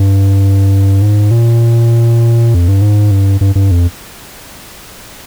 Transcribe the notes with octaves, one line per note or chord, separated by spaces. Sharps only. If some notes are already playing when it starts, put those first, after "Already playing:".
Already playing: G2
G#2
A#2
F2
G2
G#2
G2
G2
G2
F2